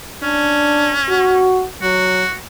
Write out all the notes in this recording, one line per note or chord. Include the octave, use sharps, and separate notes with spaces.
C#4 D4
F#4
F#3 F#4